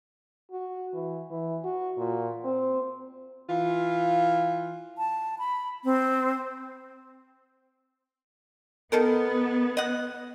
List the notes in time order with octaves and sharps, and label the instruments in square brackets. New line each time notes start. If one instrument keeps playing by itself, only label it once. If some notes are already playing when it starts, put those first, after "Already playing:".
[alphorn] F#4
E3
E3
F#4
A#2
C4
[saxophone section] E3 F4
[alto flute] A5
B5
C4
[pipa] D#3 A4 A#4 [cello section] B3
[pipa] D#5 F#5